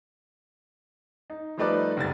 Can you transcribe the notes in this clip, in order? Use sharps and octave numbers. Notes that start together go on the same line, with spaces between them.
D#4
F3 G3 A3 D#4 B4 D5
F#1 C2 A6